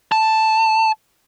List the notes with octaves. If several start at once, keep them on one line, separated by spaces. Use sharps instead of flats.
A5